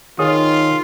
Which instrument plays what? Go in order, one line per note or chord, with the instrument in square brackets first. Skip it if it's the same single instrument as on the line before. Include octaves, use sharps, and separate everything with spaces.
[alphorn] D#3 [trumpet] F4 [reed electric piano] G#4 C#5 D#6